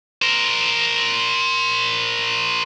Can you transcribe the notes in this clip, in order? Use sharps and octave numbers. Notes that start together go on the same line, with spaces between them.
A#4 C5